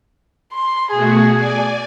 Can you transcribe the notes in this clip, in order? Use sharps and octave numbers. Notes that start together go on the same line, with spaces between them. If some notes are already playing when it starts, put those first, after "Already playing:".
C6
B2 A3 F#4 G#4
D5 G#5